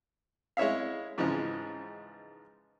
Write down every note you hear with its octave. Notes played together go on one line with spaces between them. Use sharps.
G#3 E4 C#5 E5 F5
G#2 C#3 E3 F3 G#3